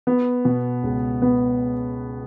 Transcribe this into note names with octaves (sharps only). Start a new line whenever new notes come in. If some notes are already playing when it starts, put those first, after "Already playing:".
B3
B2
C#2
B3